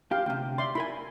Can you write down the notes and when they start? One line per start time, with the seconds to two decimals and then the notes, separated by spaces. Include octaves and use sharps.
0.11 G4 F5
0.26 D2 C3 G5
0.58 D5 E5 C6
0.75 E4 A#4 G#5 B5